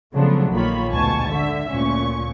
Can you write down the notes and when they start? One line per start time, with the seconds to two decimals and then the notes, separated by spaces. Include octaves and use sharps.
0.15 C#3 F3 F#3 A3 B3 D4
0.52 A#1 D#3 A#3 F4 C#5 B5
0.91 D2 G#2 B2 G#5 A5 C#6
1.29 D3 E5
1.71 D2 A#2 C#4 C#6